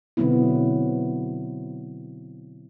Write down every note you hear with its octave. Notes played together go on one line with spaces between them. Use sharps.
B2 D3 F#3 B3 C4 E4